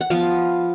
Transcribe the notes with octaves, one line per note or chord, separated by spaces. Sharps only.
F#5
F3 B3 F5